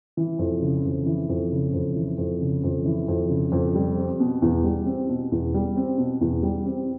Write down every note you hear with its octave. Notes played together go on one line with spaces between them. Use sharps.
E3
F2
C#3
F2
E3
F2
C#3
F2
E3
F2
C#3
F2
E3
F2
C#3
F2
G3
C4
B2
E2
G3
C4
B2
E2
G3
C4
B2
E2
G3
C4